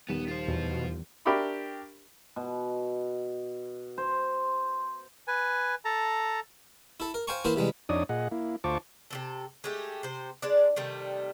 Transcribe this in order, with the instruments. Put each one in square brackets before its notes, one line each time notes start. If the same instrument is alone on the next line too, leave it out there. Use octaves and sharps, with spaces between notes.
[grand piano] D#1 D#3 E7 [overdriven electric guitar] B3
[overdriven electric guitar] F4 C5
[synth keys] E2 [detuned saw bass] B2
[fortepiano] D4 G4 A#4 E5 B5 C#6
[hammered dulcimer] B2
C5
[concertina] B4 G#5
A4 A5 A#5
[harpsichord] E4 A4
A#4
C5 F5 G5 G#5 A#5 C#6
E3 A#3 E4 A#4 C5
C3 E3 G3 G#3
[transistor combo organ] F2 D4 D#4 C#5 D5 D#6
A#2 G#4 D#5 F#5
A#3 E4
D2 F4 C5 A5 C#6 D6
[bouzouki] C3 D#3 A4
G#3 A3 G4
C3 C5
G#3 D4 D5
C3 D#3 G3 A3